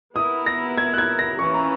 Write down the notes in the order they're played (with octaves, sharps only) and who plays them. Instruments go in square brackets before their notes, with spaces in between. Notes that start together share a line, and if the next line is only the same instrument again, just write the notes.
[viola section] B3 E4 A#4 [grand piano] D#6
[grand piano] A#6
G#6
F#6
G#6
A#6
[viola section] E3 A#3 C#4 E4 [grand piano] C#6
[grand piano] A#5